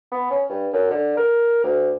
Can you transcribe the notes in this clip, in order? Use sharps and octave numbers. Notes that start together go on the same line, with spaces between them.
B3
C#4
G2
F#2
D3
A#4
D2